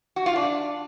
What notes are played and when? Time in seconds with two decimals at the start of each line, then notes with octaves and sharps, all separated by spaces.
0.16 F#4
0.26 F4
0.36 D4